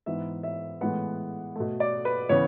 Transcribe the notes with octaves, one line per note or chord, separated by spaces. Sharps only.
G#2 E3 B3 E5
E5
A2 E3 G#3 B3 F#5
B2 A3
D5
B4
C#3 E3 B3 C#5